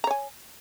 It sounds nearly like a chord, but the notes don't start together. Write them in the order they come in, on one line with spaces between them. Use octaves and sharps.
A#5 C#5 G#5